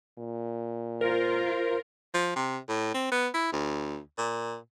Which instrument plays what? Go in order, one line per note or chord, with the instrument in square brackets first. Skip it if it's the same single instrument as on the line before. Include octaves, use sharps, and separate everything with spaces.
[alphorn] A#2
[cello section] F4 [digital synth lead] A#4 [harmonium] C5
[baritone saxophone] F3
C3
A2
C4
B3
E4
D2
A#2